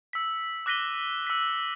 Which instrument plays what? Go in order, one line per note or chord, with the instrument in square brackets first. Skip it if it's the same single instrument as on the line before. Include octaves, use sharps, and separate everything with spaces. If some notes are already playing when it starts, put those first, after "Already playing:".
[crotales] E6 B6
D6 F#6 A#6 B6 D#7 G7
E6 B6